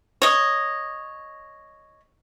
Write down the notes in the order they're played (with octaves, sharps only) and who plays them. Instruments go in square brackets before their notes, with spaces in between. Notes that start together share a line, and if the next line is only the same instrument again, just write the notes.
[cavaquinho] C#5 D#5